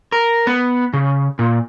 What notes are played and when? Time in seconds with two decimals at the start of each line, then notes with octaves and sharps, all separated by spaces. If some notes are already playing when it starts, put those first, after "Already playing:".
0.12 A#4
0.47 B3
0.93 C#3
1.39 A#2